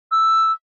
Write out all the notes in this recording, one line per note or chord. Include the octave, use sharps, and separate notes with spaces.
E6